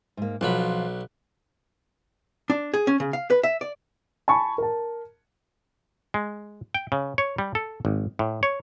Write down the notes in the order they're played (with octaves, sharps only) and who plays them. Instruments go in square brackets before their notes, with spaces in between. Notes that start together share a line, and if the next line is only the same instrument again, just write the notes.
[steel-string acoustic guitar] G#2 A#3
[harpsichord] B1 F#3 B5 [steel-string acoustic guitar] F3 F4
[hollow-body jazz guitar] D4
G#4
C#4
C#3
F5
B4
E5
D5
[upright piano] G#5 A5 B5 C#6
A#4 A5
[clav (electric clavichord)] G#3
G5
C#3
C#5
G3
A4
G#1
A2
C#5